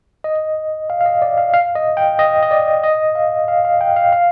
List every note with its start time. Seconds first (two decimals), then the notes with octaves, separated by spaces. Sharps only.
0.24 D#5
0.90 F5
1.01 F5
1.06 D#5
1.22 D5
1.37 F5
1.54 F5
1.75 D#5
1.97 G5
2.19 D#5
2.43 D#5
2.51 D5
2.84 D#5
3.15 F5
3.48 F5
3.65 F5
3.81 G5
3.96 F5
4.13 F5